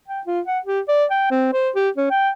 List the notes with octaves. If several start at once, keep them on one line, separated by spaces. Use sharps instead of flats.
G5
F4
F#5
G4
D5
G5
C4
C5
G4
C#4
G5